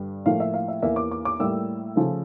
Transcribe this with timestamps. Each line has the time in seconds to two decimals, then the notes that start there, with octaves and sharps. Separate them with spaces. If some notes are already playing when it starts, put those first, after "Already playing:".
Already playing: G2 D3 G3
0.26 A2 F3 A#3 F5
0.40 E5
0.54 F5
0.68 E5
0.82 E2 E3 A#3 E5
0.96 D6
1.11 D6
1.25 D6
1.40 A2 G3 A#3 E6
1.96 C#3 F3 A3